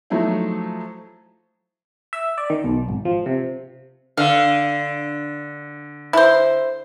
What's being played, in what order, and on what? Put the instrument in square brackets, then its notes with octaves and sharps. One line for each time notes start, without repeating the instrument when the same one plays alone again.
[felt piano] F3 F#3 A3 D#4 E4
[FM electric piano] E5
D5
D#3
B1
G#1
F3
C3
[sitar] D3 [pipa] F5
[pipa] E4 C5